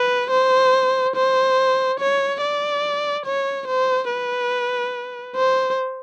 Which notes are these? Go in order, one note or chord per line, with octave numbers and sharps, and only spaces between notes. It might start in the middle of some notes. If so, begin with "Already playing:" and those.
Already playing: B4
C5
C5
C#5
D5
C#5
C5
B4
C5